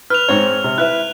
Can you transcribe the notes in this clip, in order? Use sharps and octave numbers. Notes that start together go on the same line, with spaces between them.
B4 F6 F7
G#2 C4 C#5
C3
E4 B4 E5 F#6